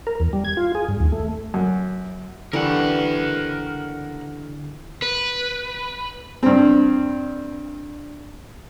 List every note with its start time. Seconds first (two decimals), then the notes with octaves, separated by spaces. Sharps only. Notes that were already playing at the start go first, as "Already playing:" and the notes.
0.07 A#4
0.20 E2
0.33 G3
0.45 G#6
0.57 F4
0.75 G#4
0.88 G2
1.00 D#2
1.12 A3
1.54 F#2
2.53 D3 E3 G3 A3 A#4 F#5
5.02 B4
6.43 G2 C4